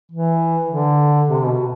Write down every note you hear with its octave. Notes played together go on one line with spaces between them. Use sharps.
E3
D3
C3
B2